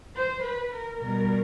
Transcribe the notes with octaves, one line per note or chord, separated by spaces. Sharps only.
C5
B4
A#4
B2 G3 A#4